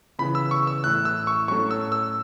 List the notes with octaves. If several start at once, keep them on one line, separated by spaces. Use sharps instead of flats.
C#3 E3 B3 B5
E6
C#6
E6
A1 A2 A3 E4 F#6
E6
C#6
A2 F#3 C#4 A4 C#6
E6
E6